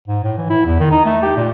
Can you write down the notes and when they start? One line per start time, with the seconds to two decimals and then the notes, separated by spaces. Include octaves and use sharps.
0.08 G#2
0.24 A2
0.37 E3
0.50 E4
0.66 E2
0.80 D#3
0.91 D#4
1.05 A3
1.23 G4
1.37 A#2